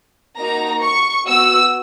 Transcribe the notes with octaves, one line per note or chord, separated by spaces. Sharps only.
A#3 D#4 F#4 A#5
C#6
B3 F#4 E6